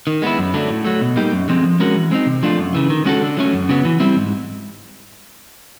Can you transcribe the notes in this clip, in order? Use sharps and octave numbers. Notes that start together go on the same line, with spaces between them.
D#3
G#3 B3 E4
F#2
D3 F#3 A3 D4
A2
F#3 A3
B2
G3 A#3 D#4 G4
F#2
D3 F3 G#3 C4
F3
G#3 C#4 F#4 A#4
E3
G#3 C4 D#4
C3
F3 A3 D4 F4
F#2
C#3 E3
D#3
G#3 C#4 F#4 A4
D3
F#3 A3 C#4
F#2
C#3 F#3 B3
E3
G3 C4 E4
G#2